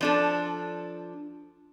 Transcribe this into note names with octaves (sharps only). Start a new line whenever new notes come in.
F3 D4 A4